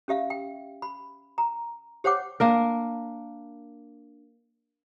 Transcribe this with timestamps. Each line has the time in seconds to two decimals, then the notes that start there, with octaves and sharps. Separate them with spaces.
0.08 C#4 G4 E5 F5
0.30 G5
0.82 B5
1.38 A#5
2.04 G4 C5 C#5 F#5 G5 D6
2.40 A#3 D4 A#4